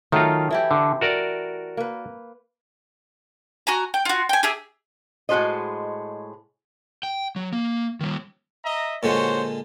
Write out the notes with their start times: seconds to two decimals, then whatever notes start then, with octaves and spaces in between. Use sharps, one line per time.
0.12 D#3 F#3 A3 D#4 F4
0.51 E3 E4 G4
0.71 D3
1.01 F#4 A#4 D5
1.77 A#3 B4
3.67 F#4 G#5 A#5
3.94 G5
4.05 F4 F#4
4.29 G5 G#5
4.43 G4 G#4 E5
5.29 A2 G#3 F#4 A4 C5 D#5
7.03 G5
7.36 F#3
7.53 A#3
8.01 D#3 G3
8.64 D#5 E5 A#5
9.03 A#2 D3 G#3 F#4 C5 C#5